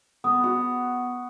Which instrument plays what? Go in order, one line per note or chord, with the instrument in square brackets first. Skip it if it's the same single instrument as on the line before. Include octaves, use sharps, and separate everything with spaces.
[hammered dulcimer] B3 [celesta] D#6
[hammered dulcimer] F#4